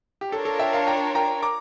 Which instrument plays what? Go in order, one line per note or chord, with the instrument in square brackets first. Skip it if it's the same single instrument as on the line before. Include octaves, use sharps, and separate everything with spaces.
[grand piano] G4
[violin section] D4 F4 A#4 C#5 [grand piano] A4
[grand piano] A4
E5 G5
F5 A5
G5 A#5
G5 A#5
A#5 D6